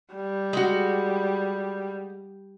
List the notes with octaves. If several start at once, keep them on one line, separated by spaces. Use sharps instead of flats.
G3
G#3 F#4